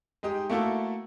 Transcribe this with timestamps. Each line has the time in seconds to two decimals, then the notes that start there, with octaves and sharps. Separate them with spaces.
0.23 G#3 D#4 G4
0.50 A3 A#3 E4 F#4 A4